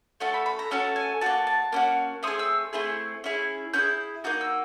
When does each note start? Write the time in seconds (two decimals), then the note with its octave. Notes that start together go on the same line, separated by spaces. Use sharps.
0.20 A3 C#4 F#4 A4 A5
0.34 B5
0.46 B5
0.59 A#5
0.71 A3 C#4 F#4 A4 A5
0.96 G#5
1.21 A#3 C#4 F#4 A5
1.47 A5
1.73 A#3 C#4 F#4
2.23 A3 C4 G#4 D#6
2.39 E6
2.73 A3 C4 E4 G#4
3.24 C#4 E4 G#4
3.73 C#4 E4 G#4 G6
4.24 A#3 D#4 F#4 G6
4.41 E6